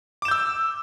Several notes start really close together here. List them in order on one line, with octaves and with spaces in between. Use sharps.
D6 E7 G6 E6